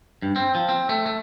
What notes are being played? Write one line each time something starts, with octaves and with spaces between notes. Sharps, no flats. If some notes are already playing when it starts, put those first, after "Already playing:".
G2
C4
F3
C4
A3
A3